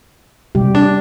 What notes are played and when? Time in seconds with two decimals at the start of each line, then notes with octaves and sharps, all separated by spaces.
0.55 C3 G3 G4
0.75 D4